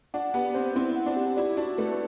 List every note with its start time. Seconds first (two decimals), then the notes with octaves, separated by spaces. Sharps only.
0.14 D4 F#5
0.34 B3 G4
0.55 C4 C5
0.75 C4 E4
0.96 F#5
1.06 D4
1.16 G4
1.37 E4 D5
1.57 D4 F#4
1.78 A3 B4